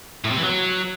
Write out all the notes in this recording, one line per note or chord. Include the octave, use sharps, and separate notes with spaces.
A2
C3
E3
F#3